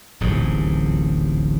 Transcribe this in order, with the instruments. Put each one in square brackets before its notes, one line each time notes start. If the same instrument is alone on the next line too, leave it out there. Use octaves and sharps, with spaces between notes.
[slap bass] D1 A1 D#2 G#2